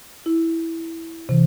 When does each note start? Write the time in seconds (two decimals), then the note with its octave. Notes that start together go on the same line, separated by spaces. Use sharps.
0.26 E4
1.29 C3 E3